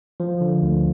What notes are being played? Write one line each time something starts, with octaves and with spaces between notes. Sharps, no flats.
F3
D3
D2